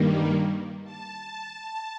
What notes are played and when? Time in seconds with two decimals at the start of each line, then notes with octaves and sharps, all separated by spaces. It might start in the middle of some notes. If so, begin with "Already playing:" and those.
Already playing: G2 D#3 G3 A#3
0.84 A5